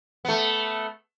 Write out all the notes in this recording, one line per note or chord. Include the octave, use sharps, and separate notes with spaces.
A3 B3